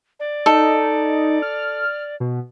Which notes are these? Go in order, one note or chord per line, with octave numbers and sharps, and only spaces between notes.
D5
D#4 A4
F6
B2